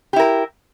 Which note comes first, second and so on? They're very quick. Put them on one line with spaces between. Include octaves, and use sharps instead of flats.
G4 E4 A#4